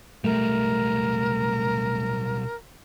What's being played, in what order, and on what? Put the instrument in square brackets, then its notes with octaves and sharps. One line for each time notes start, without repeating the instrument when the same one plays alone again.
[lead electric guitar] B1 G3 [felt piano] A3 [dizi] A#4